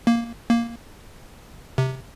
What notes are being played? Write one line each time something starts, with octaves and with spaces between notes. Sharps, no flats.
A#3
A#3
C3